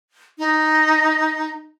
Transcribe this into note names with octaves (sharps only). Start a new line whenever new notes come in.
D#4